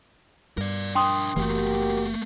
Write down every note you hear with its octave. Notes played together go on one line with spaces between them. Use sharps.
G2 A#4 D5
D4 A#4 G5 C6 D#6
F#1 E3 A3 A#3 F#4 G4 A#4